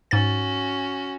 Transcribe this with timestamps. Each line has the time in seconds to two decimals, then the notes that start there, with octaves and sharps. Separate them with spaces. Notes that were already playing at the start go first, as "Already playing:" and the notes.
0.11 G#2 C#4 F#4 A6